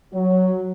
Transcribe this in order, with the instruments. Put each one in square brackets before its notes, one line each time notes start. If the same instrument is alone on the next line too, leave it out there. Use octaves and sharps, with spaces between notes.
[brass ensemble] F#3